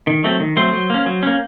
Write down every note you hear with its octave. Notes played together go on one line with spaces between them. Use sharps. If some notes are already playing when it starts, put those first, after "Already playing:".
D#3
F#3 A3 C4
D#3
F#3 A3 C4 C5
F#3
A#3 C#4
F#3
A#3 C#4